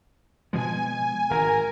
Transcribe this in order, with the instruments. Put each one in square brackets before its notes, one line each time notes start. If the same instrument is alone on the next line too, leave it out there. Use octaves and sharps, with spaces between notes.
[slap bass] B2 F3 G#3 [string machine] G#5
[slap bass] G#1 [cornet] A#4